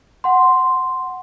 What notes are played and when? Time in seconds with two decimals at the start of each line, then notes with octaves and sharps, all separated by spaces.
0.24 F#5 C6